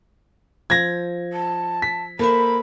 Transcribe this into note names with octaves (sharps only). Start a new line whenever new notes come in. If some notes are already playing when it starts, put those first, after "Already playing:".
F3 G#6 A#6
A5
B6
A#3 A4 C5 E5 B5